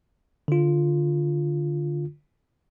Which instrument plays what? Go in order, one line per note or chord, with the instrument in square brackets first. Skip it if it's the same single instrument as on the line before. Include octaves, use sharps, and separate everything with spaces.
[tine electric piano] D3 F4